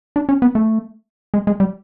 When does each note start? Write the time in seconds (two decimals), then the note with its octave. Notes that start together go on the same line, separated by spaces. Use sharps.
0.16 D4
0.29 C#4
0.42 B3
0.55 A3
1.34 G#3
1.47 G#3
1.60 G3